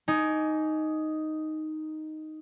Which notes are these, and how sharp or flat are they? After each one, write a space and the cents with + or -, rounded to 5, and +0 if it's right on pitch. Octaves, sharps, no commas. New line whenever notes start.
D#4 +0 G#5 +20 D6 -30